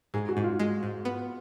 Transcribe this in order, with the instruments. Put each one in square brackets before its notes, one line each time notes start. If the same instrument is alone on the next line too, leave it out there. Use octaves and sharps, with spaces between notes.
[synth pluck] G#2 [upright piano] G#4
[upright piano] F#4
[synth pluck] G#2
[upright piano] F4
[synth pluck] G#3
G#2
B3